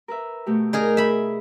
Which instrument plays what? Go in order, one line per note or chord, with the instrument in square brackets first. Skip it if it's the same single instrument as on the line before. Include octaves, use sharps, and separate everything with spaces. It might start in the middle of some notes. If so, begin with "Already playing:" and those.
[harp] A#4 B4 E5
B2 A3 G4
[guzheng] D#4 G#4 A#4 [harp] D5 G#5
[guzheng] E5 B5